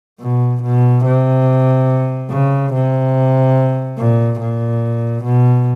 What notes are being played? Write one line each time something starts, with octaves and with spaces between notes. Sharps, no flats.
B2
B2
C3
C#3
C3
A#2
A#2
B2